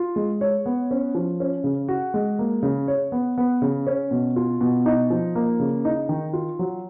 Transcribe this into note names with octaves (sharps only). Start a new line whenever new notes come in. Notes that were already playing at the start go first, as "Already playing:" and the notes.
Already playing: F4
G#3
C#5
B3
C#4
F3
C#4
C#3
F#4
G#3
A#3
C#3
C#5
B3
B3
C#3
C#4
B2
F4
B2
D#4
F3
A#3
C#3
D#4
D#3
F4
F#3